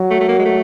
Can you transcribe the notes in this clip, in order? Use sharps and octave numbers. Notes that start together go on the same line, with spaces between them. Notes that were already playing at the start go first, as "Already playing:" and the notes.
Already playing: F#3
A3
A3
A#3
G#3
A3